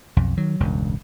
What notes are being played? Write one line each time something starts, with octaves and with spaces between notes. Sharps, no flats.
B1 F2
D#3 F#3
E1 C#2 G2